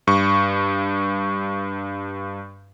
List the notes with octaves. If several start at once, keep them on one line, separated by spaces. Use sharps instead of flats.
G2 C#6